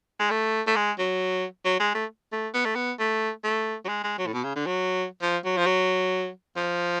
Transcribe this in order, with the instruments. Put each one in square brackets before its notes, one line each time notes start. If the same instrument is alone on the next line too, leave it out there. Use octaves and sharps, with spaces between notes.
[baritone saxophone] G#3
A3
A3
G#3
F#3
F#3
G#3
A3
A3
B3
A3
B3
A3
A3
F#3
G#3
G#3
F#3
A2
B2
C#3
D3
F#3
F3
F#3
F3
F#3
F3